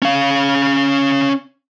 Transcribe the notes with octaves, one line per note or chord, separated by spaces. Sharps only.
C#4 F5